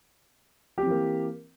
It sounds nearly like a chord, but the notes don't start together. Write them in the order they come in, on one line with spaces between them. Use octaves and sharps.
G4 C4 E3 A#3